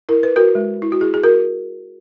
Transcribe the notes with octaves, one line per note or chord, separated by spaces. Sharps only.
E4 A#4
B4
F#4 A#4
G#3
E4
F#4
E4 G#4
G#4
F#4 A#4